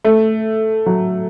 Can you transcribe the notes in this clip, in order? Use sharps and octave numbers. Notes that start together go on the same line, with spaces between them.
A3
F#3